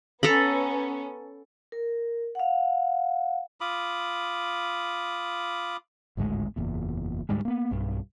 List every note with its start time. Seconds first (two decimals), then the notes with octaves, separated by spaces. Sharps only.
0.23 B3 C#4 A4 A#5 B5
1.72 A#4
2.35 F5 F#5
3.61 F4 B5 D6 D#6
6.17 G#1 D2 A2 G#3
6.56 F#1 E2 A#2
7.29 D2 G#2 G3 G#3
7.45 A#3 B3
7.71 B1 G2